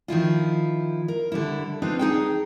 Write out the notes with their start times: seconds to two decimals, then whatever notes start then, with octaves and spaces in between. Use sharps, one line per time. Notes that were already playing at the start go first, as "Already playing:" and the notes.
0.08 D#3 F3 E4 F4
1.08 A#4
1.32 D3 G3 E4
1.82 C4 D4 D#4 F4 B4
1.99 D#4 G#4 G5